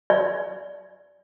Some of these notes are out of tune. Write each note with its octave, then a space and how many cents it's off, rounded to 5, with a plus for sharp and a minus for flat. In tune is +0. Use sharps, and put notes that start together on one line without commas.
D5 -15